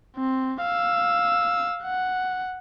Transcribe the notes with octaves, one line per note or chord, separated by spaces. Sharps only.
C4
F5 E6
F#5